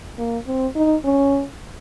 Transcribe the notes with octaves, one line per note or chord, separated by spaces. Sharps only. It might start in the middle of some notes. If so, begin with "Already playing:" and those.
A#3
C4
D#4
C#4